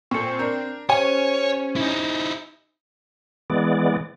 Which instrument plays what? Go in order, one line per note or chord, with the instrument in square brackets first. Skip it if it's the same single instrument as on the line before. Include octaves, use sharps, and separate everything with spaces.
[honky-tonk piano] A#2 A4 [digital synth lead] C4 [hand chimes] C#6 C#7
[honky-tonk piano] D4 A#4 [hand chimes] G6
[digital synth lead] C#4 [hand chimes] G4 C5 [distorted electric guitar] C#5 [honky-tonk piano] G#5
[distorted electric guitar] D#4 E4
[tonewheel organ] E3 G#3 B3 D5